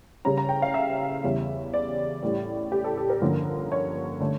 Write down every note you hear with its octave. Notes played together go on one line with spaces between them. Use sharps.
C#3 G3 C#4 A#5
A#5
G5
F5
E5
E2 C#3 G3 C#4
D5
A2 G3 C#4
G4
A4
A4
A#4
G2 D3 F3 A#3 C#4
C#5
D3 A3 C#4